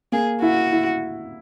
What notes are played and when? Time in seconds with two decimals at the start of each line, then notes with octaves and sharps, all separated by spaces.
0.12 A#3 G#4
0.42 E4 F#4
0.72 E4